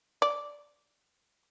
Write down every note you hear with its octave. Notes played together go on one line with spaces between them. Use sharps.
D5